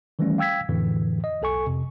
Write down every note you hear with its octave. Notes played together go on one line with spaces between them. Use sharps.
D#3 E3 G3 A3 C#4
F5 G5 E6 G#6 B6
F2 A2 D3 E3
D#5
B1 A4 G#5 C#6
F2 C3